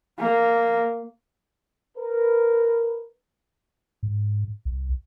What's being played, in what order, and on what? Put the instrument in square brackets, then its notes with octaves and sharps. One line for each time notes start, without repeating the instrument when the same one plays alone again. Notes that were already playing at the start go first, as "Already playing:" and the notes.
[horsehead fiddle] A#3
[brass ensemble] A#4 B4
[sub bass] G#2
C2